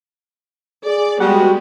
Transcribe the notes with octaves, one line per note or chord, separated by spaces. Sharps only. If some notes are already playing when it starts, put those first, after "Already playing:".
G#4 D5
G3 G#3 B3 F#4